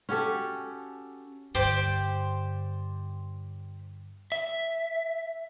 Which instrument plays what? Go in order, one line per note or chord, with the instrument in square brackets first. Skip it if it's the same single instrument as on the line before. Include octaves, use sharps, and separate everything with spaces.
[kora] C#4 F#4 G4 A4
[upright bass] G2 D3 [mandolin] G4 C5 D5
[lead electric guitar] E5